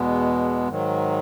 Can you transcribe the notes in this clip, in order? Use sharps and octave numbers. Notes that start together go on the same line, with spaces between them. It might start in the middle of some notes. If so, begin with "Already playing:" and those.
Already playing: E2 B2 G#3 B3
G#2 D#3 F#3